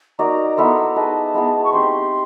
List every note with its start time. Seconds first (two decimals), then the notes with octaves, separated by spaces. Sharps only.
0.19 D#4 F#4 A#4 D5 A#5
0.57 B3 E4 A4 C5
0.86 A#5
0.96 D#4 G#4 B4 D#5 A5
1.34 G#3 B3 E4 G#4
1.64 C#6
1.73 C4 D#4 G4 C6